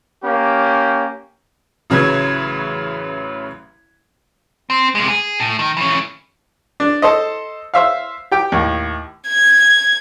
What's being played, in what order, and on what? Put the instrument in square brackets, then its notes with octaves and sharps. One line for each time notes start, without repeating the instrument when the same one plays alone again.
[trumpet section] A#3 C#4 G4
[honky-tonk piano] A1 C#3 F#3 B4 G#6
[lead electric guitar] C4
C3 G#3
G#4
A2
D#3
E3 C#4
[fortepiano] D4
A4 C5 D#5
C5 E5 F5
G4 G5
D#2 A2
[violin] G#6